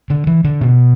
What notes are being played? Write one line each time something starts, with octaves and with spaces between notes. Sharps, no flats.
D3
E3
D3
B2